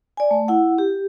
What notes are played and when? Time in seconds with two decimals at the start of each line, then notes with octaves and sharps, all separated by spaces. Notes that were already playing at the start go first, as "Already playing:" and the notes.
0.17 D5 G#5
0.31 A3
0.48 E4 F#5
0.78 G4